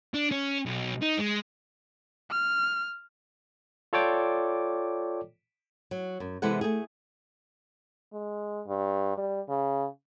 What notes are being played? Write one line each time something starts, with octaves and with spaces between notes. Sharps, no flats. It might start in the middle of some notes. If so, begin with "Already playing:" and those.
D4
C#4
B1
D#4
G#3
F6
F4 A4 C#5 D5 G5 D6
F#3
F#2
C3 E3 G#3 B3 A4 F#5
A3 G#4
G#3
G2
G3
C#3